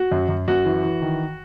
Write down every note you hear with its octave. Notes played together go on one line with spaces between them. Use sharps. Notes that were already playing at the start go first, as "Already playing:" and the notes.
Already playing: F#4
F#2
F#2
F#2 F#4
E3
E3
D#3